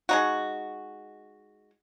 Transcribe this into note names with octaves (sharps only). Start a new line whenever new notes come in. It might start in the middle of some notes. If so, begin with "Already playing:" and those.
G#3 D#4 F#4